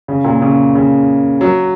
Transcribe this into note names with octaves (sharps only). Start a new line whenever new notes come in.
C#3
A#2
C#3
C#3
F#3